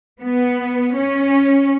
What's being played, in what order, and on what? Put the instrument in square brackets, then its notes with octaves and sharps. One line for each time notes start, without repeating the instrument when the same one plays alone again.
[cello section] B3
C#4